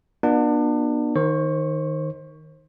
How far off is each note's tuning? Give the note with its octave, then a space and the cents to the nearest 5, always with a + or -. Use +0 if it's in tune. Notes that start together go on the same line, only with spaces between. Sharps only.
B3 -45 D4 +30 F4 +45
D#3 +0 C5 +30 C#6 +0